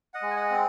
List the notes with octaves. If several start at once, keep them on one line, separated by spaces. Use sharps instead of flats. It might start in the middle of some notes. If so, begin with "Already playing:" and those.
D#5 F#5
G#3
G#5
D#5 F#5
C4